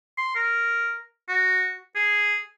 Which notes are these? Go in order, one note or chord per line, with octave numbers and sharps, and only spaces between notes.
C6
A#4
F#4
G#4